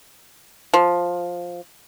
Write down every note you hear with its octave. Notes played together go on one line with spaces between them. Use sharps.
F3